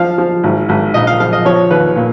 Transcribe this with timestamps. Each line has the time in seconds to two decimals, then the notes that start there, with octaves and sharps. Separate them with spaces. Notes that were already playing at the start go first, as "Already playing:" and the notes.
Already playing: F3 F5
0.18 F3
0.43 G#1
0.69 G#1
0.94 A#1 D#5
1.07 F5
1.20 F3 F5
1.33 D#5
1.45 F3 C#5
1.71 D#2 B4
1.96 A#2